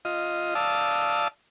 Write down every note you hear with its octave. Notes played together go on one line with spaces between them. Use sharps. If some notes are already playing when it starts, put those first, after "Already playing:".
F4 D#5
D5 F5 A5 D#6 E6